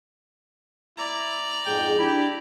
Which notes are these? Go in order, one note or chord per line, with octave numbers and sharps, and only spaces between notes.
E4 D5 A#5
F2 G#2 G#4 G5
D4 E4 G4